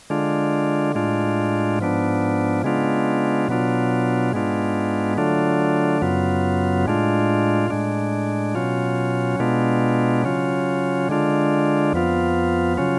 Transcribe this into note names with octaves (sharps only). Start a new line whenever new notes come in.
D3 G#3 D4 F4
A2 G#3 D4 F4
G#2 F3 B3 D4
C#3 G#3 B3 D4 F4
B2 F#3 B3 D4 F4
G#2 G#3 B3 D4 F4
D3 F#3 A3 D4 F4
F#2 C#3 F#3 B3 F4
A2 G#3 D4 F4
A2 G#3 D4
B2 F#3 C#4 F4
B2 G#3 B3 D4 F4
C#3 F#3 C#4 F4
D3 G#3 D4 F4
F2 F3 B3 F4
C#3 F#3 C#4 F4